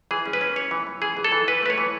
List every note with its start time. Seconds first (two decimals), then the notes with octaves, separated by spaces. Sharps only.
0.11 E3 G#4
0.25 C#4
0.33 B4
0.41 C#4
0.56 E3 C#5
0.71 E3
0.87 E3
1.02 E3 G#4
1.17 E3
1.24 A4
1.32 E3
1.48 E3 B4
1.63 A3 B4
1.70 C#5
1.78 E3